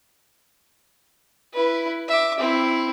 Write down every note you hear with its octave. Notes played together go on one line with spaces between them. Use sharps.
E4 B4
E5 D6
C4 E4